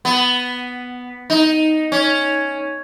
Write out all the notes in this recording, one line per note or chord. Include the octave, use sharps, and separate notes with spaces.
B3
D#4
C#4